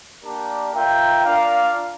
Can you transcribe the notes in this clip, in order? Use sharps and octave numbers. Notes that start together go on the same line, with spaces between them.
A#3 D4 G4 A#4 D5
F4 A#4 E5 G5
D4 F4 A#4 D5 F5